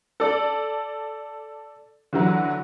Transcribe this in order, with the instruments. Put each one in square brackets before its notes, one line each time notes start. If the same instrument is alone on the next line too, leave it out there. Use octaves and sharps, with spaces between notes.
[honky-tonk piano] A4 D5
D3 E3 F#3